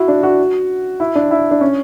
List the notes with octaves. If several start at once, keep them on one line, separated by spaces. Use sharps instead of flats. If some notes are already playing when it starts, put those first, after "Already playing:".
Already playing: E4 F#4
D4
F#4
E4
D4
E4
D4
C#4